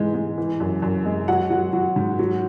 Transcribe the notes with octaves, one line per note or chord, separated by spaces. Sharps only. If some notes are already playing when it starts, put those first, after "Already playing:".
Already playing: G#2 E3 G#3
G#3
E3
F#2
F#2
G#3
F#3 F#5
F#3
F#3
G#2
F#3